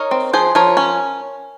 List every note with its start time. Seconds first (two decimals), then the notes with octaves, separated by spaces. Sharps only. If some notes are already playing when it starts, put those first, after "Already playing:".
Already playing: D#4 A#4 C#5
0.11 C4
0.33 F3 G#4 C5
0.55 F3 A#4 C#5
0.77 C#4